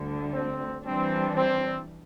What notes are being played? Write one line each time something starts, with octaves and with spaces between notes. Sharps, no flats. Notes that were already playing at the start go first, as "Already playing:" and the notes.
Already playing: D2 D3 G3
C4
E3 G3 C4 D4
C4